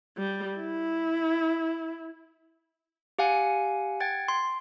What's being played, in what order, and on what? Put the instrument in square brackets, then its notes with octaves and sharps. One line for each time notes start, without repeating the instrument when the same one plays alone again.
[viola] G3
E4
[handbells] G4 F5 F#5 G#5
F#5 G5 G#6 A6
C6